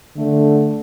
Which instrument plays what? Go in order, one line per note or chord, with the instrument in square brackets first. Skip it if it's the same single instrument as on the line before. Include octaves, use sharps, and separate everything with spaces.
[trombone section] D3 A3